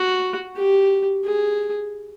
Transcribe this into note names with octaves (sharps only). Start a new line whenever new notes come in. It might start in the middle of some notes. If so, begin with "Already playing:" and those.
Already playing: F#4
G4
G#4